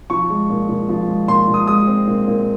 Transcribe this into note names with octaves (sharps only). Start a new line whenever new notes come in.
F3 C#6
G#3
A#2
A#2
F3
G#3
A#2 C6
A#2
D#6
G#3 D#6
C4
A#2
A#2